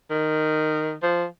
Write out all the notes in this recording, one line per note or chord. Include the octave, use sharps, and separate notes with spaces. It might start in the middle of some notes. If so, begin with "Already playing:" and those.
D#3
F3